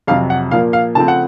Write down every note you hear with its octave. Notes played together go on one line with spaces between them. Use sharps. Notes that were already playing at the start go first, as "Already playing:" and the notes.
F2 C3 F#3 F5
F#5
A#2 F3 A#3 F5
F5
C#3 F3 A3 C4 A5
F#5